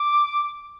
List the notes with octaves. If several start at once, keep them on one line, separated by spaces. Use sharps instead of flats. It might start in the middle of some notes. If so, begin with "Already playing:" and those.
Already playing: D6